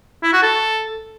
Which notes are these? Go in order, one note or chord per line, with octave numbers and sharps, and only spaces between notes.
E4
F#4
A4